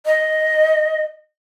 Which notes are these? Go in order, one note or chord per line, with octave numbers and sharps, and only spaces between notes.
D#5